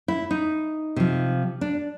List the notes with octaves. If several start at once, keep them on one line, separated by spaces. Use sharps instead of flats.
E4
D#4
C3 F3
D4